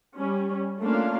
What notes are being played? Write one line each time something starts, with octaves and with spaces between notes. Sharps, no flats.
G3 C#4
A3 A#3 C#4 D4 F4 F5